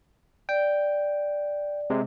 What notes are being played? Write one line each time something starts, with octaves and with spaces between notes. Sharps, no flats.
D5 G5
C3 G#3